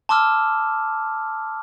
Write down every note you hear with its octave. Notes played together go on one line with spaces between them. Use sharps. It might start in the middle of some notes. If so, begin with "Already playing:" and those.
A5 C6 D6 E6 F6